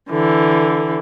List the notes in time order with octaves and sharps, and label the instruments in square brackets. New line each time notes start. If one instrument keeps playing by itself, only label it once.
[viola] D3 E3